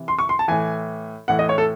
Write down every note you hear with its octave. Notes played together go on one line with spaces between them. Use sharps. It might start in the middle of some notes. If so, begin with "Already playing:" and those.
Already playing: C3 E3
C6
C#6
C6
A5
A2 E3 G#5
A2 E3 F#5
D#5
C#5
A4